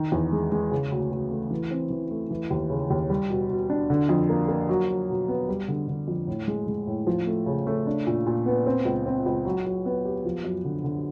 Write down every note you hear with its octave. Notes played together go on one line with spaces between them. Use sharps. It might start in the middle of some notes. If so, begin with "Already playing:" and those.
Already playing: D#3
E2
G#3
G#3
C#3
D2
D2
A3
E3
C4
E3
A3
E3
D#2
C#3
D#2
G3
B2
B2
D4
D3
F2
A#3
A#3
F#3
F#3
B2
B3
G3
D3
D3
F2
A2
G#3
G#3
A2
F3
A3
C#3
A3
D4
A#2
A#2
B3
C4
C#2
C4
C#2
F#3
F#3
B3
G4
F3
F#2
D3
D3